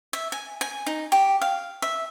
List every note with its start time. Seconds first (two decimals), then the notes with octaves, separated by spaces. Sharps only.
0.13 E5
0.32 G#5
0.61 G#5
0.86 D#4
1.12 G4
1.42 F5
1.82 E5